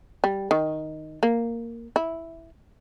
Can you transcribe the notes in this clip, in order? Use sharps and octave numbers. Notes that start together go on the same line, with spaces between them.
G3
D#3
A#3
E4